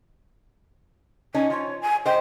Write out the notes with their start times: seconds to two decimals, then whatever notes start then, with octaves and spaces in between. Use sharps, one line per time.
1.35 C#4 D#4 G#5
1.50 F3 C#5
1.81 G#5
2.06 C5 D#5 G5